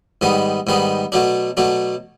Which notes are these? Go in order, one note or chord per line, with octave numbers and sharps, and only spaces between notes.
G#2 D#3 G3 B3 D#4
G#2 D#3 G3 B3 D#4
B2 F#3 A3 D4
B2 F#3 A3 D4